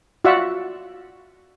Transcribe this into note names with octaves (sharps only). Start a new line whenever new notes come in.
F4 F#4 D5 E5 F#5